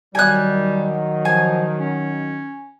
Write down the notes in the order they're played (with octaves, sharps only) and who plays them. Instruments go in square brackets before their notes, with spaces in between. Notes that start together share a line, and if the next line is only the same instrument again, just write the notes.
[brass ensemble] D#3 F#3 [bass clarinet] G3 [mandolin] G#5 F#6
[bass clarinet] F3 [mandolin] G#5
[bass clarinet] C#4